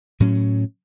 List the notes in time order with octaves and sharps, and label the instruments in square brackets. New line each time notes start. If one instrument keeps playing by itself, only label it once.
[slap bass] A2 F#3 C#4